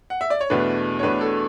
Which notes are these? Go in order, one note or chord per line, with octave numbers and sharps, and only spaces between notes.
F#5
E5
D5
C#5
E2 B2 A3 D4 B4
C#5
E2 B2 A3 D4 B4
A4